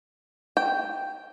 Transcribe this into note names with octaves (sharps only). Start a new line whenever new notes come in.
G5